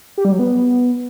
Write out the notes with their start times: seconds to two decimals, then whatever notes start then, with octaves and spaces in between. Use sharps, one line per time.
0.18 G4
0.25 G3
0.32 F#3
0.39 B3